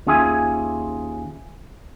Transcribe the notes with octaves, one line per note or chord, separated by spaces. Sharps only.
D#2 C#4 F4 G#4 E5 G#5